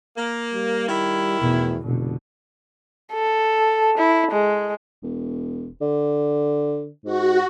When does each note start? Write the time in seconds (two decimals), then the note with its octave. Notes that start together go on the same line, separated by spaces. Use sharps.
0.17 A#3
0.54 G3
0.89 D#3 E4
1.41 E2 B2 A3
1.84 F1 B2 D3
3.13 A4
3.97 E4
4.31 G#3
5.03 E1
5.81 D3
7.05 G#2 F#4